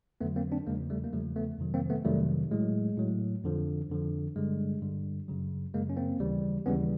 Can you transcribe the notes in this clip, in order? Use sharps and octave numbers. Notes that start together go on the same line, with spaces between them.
F2 D3 F#3 A3 B3
A#3 C4
C4 D4
E2 C#3 F3 G#3 A#3
G3 A3
A#3
E2 C#3 F3 G3 A3
A3 B3
F2 C3 D#3 F#3
A#3 C4
A3 B3
F2 C3 D#3 F#3 G3 A3
A2 F#3 G#3
A2 F#3
F2 D3 F3
F2 D3 F3
G2 D3 G3 G#3
G2 D3 G3
F#2 C#3 F#3
F#2 C#3 F#3 G#3 A#3
C#4
A#3 C4
D#2 C#3 E3 G3
D#2 C#3 E3 G3 B3 C#4